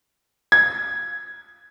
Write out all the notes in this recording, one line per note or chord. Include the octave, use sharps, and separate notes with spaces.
G#6